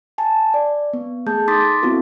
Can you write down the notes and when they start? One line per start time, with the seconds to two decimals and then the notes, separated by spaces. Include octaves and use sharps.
0.18 G#5 A5
0.54 D5
0.93 B3
1.26 A3 G#4 A5 G6
1.48 D#4 C6 D6 D#6 A6 B6
1.82 B3 C4 E4 F#4 A4